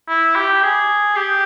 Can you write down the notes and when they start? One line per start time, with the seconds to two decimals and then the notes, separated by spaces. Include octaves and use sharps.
0.08 E4
0.36 G4
0.62 G#4
1.16 G4